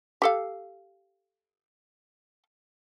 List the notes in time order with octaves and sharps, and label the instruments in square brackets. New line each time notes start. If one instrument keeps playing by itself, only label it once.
[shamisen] G4 A4 F5